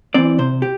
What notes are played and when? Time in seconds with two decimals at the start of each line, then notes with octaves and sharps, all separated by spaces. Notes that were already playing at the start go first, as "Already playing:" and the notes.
0.14 E3 C4 D5
0.39 C3 C5
0.62 G4